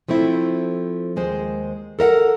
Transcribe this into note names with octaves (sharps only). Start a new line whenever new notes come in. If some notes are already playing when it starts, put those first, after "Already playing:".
F3 A3 C4 E4
D#2 G#3 C5
A4 A#4 E5 F#5